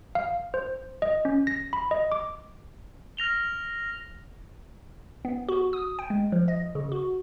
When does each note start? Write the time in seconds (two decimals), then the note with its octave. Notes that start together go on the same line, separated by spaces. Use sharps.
0.15 F5
0.54 C5
1.02 D#5
1.25 C#4
1.47 A#6
1.73 B5
1.91 D#5
2.12 D6
3.17 F6 A#6 F7 G7
5.25 B3
5.49 F#4
5.73 D#6
5.99 G5
6.10 G#3
6.32 F3
6.48 D#5
6.75 C#3
6.92 F#4